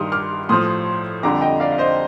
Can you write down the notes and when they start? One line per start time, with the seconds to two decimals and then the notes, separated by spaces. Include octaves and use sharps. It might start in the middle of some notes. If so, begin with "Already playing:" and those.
Already playing: G2 D#3 G3 C6 D#6 F6
0.12 D6 F6
0.49 A2 F3 C6 D#6
1.23 F2 D3 G3 A#5 D6
1.42 D#5 G5
1.60 D5 F5
1.72 F5
1.78 C5 D#5